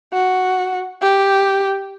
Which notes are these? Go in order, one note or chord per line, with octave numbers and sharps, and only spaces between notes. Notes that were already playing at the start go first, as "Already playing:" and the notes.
F#4
G4